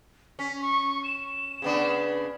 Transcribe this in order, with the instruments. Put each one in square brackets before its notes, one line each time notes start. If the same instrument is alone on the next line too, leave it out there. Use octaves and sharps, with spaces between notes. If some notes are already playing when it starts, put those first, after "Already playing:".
[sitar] C#4 [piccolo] B6
[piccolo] C#6
E7
[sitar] C#3 B3 D4